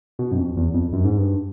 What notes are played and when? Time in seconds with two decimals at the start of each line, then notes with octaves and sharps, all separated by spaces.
0.19 B2
0.32 F#2
0.37 F2
0.57 E2
0.74 F2
0.93 F#2
1.05 G#2
1.18 G2